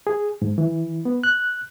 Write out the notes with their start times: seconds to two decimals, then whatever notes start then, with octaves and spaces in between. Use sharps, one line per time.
0.07 G#4
0.42 G#2
0.58 E3
1.05 B3
1.24 F#6